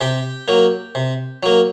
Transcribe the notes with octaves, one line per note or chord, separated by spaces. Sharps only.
C3 G4 G5
F#3 A#3
C3
F#3 A#3